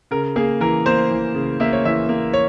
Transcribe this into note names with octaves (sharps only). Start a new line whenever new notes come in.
C#3 A#4
A#3 G#4
E3 A#4
A#3 C5
E3
C#3
A#3 E5
C#5
E3 E5
A#3
C#5